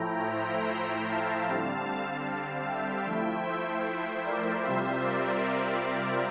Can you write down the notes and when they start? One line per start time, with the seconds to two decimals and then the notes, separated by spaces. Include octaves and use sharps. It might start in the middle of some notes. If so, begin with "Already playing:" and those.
Already playing: A2 F3 A3 E4 G5 A#5
0.29 C5 E5
1.08 F5 A5
1.48 D3 G3 C4
2.26 F5 A5
2.66 E5 G5
3.05 F3 A3 E4
3.45 C5 E5
4.24 A#4 D5
4.63 C3 G3 C4 F4 C5 E5
5.03 A#4 D5
5.42 A#4